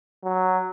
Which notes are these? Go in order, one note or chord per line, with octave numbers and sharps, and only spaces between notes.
F#3